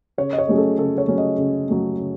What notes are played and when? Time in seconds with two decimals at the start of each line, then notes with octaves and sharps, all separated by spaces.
0.18 C#3 C#5
0.33 D#5
0.38 C#5
0.48 F#3 A3 C#4 G#4
0.58 A4
0.78 C#3 A4
0.98 C#5
1.08 F#3 A3 C#4
1.18 D#5
1.38 C#3
1.68 F#3 A3 C#4
1.98 C#3